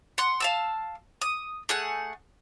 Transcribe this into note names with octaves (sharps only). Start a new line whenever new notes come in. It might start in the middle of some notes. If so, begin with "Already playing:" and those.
F#5 C6
F5 A5 E6
D#6
A3 G#4 F#5